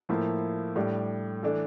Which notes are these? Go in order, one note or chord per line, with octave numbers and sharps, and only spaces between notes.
A2 F3 A#3 E4
A2 G3 D4
E3 A3 D4 A4